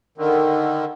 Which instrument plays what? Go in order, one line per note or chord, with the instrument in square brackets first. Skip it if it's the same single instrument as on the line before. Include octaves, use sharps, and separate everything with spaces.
[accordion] D3 D#3